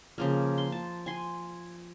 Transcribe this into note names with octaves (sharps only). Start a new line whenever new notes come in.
C#3 F3 A#3
C6
A5
G#5 C6